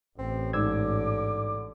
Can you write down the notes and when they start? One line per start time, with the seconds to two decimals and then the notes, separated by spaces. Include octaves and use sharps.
0.19 A1 C4
0.53 G#2 D3 D6 E6 G#6